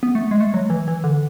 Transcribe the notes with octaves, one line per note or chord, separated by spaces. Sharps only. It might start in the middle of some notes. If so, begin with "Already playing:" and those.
B3
A3
G#3
A3
F#3
E3
E3
D3